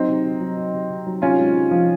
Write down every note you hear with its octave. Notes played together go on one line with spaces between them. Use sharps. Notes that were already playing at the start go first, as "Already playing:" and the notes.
Already playing: F#3 C4 D#4
C3
C3
F#3
F#3
C3
C3
F#3
C3 C#4 F4
G#3
C3
F3